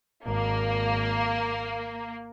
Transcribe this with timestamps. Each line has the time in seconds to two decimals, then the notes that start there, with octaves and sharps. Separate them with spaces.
0.25 G#1 A#3